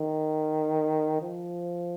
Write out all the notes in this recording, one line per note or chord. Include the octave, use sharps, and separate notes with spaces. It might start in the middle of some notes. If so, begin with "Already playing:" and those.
Already playing: D#3
F3